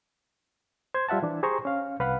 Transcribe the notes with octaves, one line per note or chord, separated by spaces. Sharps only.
C5 G#6
G3 F4 E5 F#5 A5
E3 D4
G4 G#4 C5 A#5 C#6
C#4 F5
C2 B4 F5 F#5 B5